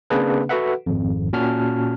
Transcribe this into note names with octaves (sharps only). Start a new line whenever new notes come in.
C#3 A#3 C4 D4 G#4 B4
F#4 A4 B4 E5 F#5
G#1 F2
A#2 C#4 F#4 A5 F6